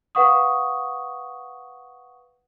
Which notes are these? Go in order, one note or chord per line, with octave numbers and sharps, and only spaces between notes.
B4 F5 F#5 C#6 D#6